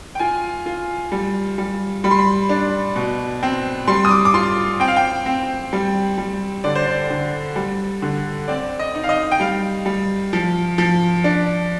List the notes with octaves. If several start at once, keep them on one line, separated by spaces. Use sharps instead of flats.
G5
F4 G#5
F4
G3
G3
G3 B5
C6
B5
D4
B2
C4
G3 C6
D#6
D6
D6
F4 C6
C4 G5
F5
G5
C4
G3
G3
D3 D5
C5
D5
D3
G3
D3
C4 D5
D#5
D#4
F5
D#5
G5
G3 F5
G3
F3
F3
D4